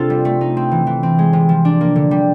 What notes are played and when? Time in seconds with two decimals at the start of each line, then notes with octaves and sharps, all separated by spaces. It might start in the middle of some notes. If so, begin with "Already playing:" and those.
Already playing: C3 C4 D4 F4 A4
0.10 G3
0.25 A3
0.41 D#4
0.57 C4
0.72 E3
0.87 E3
1.03 C4
1.19 G#3
1.33 C3
1.49 F3
1.65 D4
1.81 A#3
1.96 D3
2.11 G3